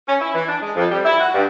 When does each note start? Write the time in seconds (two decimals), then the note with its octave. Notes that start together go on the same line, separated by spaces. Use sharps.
0.08 C#4
0.21 E4
0.35 E3
0.48 D4
0.62 G#3
0.76 F2
0.91 G3
1.05 E4
1.20 F#4
1.34 G2